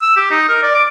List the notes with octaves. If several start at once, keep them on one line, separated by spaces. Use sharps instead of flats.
E6
G4
D#4
A#4
D5
D6